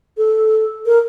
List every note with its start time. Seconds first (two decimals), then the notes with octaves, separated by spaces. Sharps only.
0.18 A4
0.86 A#4